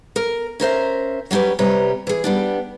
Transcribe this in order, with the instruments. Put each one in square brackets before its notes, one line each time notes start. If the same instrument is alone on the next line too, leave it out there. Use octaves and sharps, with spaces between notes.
[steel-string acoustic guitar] A#4
C#4 A#4 C5 E5
F#3 G3 C#4 G4 B4
C3 G3 B4 C#5 A#5
E3 G#4
G3 B3 D4